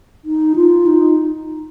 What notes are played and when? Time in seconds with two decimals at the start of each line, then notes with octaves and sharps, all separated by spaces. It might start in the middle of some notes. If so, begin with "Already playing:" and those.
0.25 D#4
0.56 F4
0.87 D#4